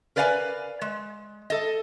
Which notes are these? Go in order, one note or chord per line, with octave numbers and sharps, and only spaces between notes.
A#4 B4 D5 F5 F#5 G#5
G#3
A4 D#5